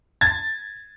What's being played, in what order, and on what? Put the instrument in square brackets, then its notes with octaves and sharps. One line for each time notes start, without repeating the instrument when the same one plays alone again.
[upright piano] G#6 A6